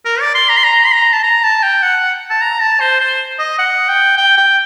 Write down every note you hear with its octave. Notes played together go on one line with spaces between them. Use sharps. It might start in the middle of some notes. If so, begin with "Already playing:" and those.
A#4
D5
C6
A#5
C6
A#5
C6
A#5
A5
A#5
A5
G5
F#5
A5
A#5
A5
C5
C5
D#5
F#5
G5
G5
G5